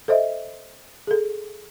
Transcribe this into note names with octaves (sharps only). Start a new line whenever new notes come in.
A4 C5 D#5 E5
G#4 A4